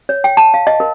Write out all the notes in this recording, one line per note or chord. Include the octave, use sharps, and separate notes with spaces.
C#5
G5
A5
F5
D#5
A#4